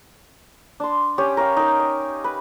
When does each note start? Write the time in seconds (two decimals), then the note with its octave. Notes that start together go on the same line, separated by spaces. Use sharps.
0.80 D4 C6
1.18 C#4 G4 C#5
1.37 A#4 C#5 F5 G5
1.57 D#4 A#4
1.80 D#5
2.24 B4